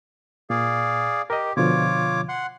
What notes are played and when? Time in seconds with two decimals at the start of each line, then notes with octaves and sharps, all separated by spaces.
0.50 A#2 G#4 D5 F5
1.30 G4 A#4 D#5
1.57 B2 D3 F3 F4 C#5 D6
2.29 F#5 C6 F#6